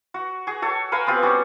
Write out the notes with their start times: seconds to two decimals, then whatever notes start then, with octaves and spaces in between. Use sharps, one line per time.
0.14 F#4
0.47 F#4 G#4
0.62 F#4 A4 C#5
0.92 A#4 B4 F5 G#5
1.07 B3 C4 F4 G4
1.22 G3 C#4 F#4